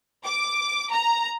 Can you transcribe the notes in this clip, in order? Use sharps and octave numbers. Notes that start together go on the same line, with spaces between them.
D6
A#5